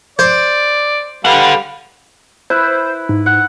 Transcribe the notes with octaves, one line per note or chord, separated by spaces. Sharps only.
C5 D5
G3 A4 B4 F5 F#5
E4 B4 C5
G#2
F#5